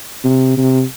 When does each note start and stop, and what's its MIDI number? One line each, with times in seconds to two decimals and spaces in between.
0.24 0.56 48
0.57 0.83 48